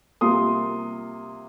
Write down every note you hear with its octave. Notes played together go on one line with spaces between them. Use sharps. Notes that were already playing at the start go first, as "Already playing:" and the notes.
C3 G3 A#3 F4 C6 D#6